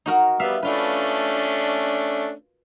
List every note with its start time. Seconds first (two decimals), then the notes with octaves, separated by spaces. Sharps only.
0.06 D#4 F#4 A#4
0.40 G3 B3 E5 F5
0.63 A3 C#4 D4 F4 B4